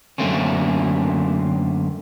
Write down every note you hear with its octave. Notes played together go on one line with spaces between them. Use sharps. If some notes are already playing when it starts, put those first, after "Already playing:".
F#2 D3 A3 A#3 C4 C#4